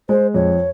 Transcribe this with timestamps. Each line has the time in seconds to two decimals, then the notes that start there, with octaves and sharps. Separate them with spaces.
0.09 G#3 C5
0.34 F2 C#5